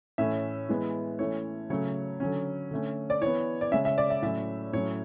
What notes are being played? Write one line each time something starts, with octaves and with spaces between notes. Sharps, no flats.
A2 E3 A3 C#4 E5
E3 G#3 B3
E3 A3 C#4 C#5
C#3 F#3 A3 C#4 C#5
D3 F#3 C#4
D3 A3 C#4
D5
E3 B3 C#5
D5
C#3 G#3 C#4 E5
E5
D5
E5
A2 F#3 C#4 E5
A2 F#3 C#4 C#5